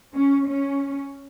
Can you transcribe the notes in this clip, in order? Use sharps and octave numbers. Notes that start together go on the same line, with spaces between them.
C#4
C#4